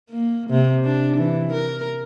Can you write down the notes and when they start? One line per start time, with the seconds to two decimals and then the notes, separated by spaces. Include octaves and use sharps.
0.10 A#3
0.50 C3
0.85 D4
1.16 E3
1.52 A#4